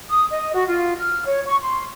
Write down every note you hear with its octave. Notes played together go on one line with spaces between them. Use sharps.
D#6
D#5
F#4
F4
F6
C#5
C#6
C6